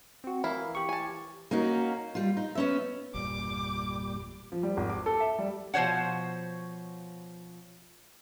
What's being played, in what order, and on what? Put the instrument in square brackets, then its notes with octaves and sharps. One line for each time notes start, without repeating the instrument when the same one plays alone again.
[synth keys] C4 F#4
[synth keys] E3 [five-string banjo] E4 [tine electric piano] A#4 F5
[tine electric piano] G4 C#6
[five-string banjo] G#5 A5
[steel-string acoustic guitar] A#3 C#4 D#4 F#4
G3 F4
D#4
B3 C#4 E5
[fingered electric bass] G1 E2 [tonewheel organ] A#2 G3 [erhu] D6
[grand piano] F3
G3
G#1
D6
A4
E5
G3
[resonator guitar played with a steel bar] B2 F3 C5 C#5 F#5